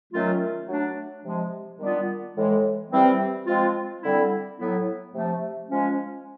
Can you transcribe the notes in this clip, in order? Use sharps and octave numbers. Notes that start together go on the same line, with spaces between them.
D#3 F#3 A3 C#4 F4
F#3 A3 D4
C3 F3 G#3
D#3 G3 B3 D4 F4
A2 E3 G#3
C3 E3 G3 C4
F3 G#3 C4 F4
D3 G3 C4 E4
A2 F#3 B3 E4
C3 F3 A3
F3 G#3 C#4